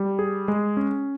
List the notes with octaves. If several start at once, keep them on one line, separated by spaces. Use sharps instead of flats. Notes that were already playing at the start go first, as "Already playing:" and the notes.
Already playing: G3
G#4
G#3
C#4